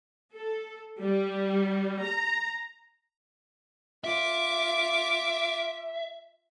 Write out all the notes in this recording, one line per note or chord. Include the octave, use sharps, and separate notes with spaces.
A4
G3
A#5
F4 E5 D6